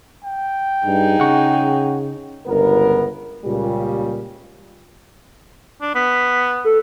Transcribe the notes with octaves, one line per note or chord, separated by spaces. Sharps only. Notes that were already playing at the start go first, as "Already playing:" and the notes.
G5
G2 D#4 G#4
C#3 F#5 C#6
G1 C#2 B3 A#4
C#2 A#2 C#3 G3
D4
B3 B6
A4